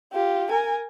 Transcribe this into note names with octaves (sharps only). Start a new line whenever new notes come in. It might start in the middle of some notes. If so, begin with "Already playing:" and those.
F4 G4
A#4 G#5